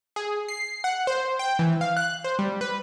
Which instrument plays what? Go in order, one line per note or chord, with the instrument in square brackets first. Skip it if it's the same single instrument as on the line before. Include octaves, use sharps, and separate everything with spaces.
[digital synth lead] G#4
C7
F#5
C5
G5
E3
F5
F#6
C5
G3
B4